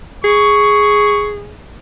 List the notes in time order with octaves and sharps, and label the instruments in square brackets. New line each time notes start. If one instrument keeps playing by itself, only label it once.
[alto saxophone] G#4 [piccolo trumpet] C#6